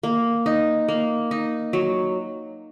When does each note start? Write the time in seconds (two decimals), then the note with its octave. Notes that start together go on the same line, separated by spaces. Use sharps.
0.03 A#3
0.46 D#4
0.88 A#3
1.31 D#4
1.73 F#3